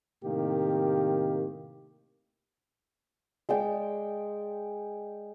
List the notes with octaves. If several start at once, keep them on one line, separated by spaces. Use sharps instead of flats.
A2 C3 D#3 A#3 G4
G#3 D5 G5